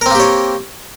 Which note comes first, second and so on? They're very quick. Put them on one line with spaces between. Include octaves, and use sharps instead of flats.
A#4 C4 A#3 G4 C#5